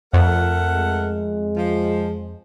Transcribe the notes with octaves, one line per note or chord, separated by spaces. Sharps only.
F2 A3 A#4 F#5
G#3
F3